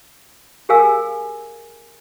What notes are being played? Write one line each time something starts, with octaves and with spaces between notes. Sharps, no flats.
G4 G#4 A#4 F5 G#5 E6